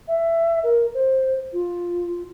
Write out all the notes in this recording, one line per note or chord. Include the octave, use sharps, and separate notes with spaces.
E5
A#4
C5
F4